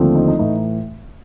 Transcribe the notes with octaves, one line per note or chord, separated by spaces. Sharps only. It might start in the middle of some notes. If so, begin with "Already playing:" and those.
Already playing: D#2 D3 F3 A3 C4
D#4
D#4
A2 E3 A3 D#4